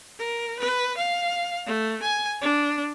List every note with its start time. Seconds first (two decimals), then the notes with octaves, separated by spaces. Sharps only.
0.19 A#4
0.59 B4
0.97 F5
1.66 A3
2.02 G#5
2.42 D4